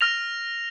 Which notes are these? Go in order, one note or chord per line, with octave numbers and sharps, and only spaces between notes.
F6 A#6 F7